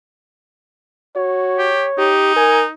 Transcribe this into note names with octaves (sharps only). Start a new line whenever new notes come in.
F#4 C#5
G4
D#4 G4
A#4 G#5